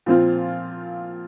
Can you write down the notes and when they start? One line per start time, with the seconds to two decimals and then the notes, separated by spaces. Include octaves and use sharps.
0.06 A#2 F3 C4 F4